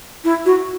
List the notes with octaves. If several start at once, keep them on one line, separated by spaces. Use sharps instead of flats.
E4
F#4